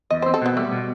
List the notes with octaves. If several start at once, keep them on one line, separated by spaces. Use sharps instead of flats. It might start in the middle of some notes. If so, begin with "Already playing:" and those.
E2 D#5
C5
C4
A4
B2 B3
G3 A3
B2